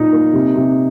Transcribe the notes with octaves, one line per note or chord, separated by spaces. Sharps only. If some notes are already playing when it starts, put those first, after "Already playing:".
Already playing: A#2 A#3 D#4 F4
A#3
C3
C3